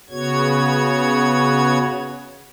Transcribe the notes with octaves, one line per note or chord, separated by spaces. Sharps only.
C#3 B3 F#4 C#5 G#6